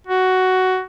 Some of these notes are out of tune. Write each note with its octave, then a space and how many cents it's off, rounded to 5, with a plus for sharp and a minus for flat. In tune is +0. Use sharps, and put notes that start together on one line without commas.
F#4 +10